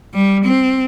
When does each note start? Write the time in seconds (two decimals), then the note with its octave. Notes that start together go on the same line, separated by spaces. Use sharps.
0.14 G3
0.45 C4